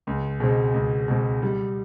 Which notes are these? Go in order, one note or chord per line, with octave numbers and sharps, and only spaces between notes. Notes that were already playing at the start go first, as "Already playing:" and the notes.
C#2
B2 G#3 C4
C#2
B2 G#3 C4
G3